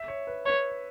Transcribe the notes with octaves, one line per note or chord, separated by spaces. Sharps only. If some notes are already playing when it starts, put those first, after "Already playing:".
Already playing: E5
C#5
B4
B4 C#5